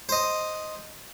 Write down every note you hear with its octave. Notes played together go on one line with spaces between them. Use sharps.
C5 D#5